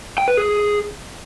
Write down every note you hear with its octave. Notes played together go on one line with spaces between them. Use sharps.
G5
B4
G#4